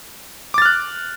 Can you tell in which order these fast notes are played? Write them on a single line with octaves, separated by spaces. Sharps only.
D6 A6 F6 F#6